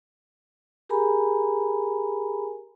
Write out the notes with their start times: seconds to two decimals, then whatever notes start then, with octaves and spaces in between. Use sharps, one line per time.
0.89 G4 G#4 A#4 G#5 A#5 B5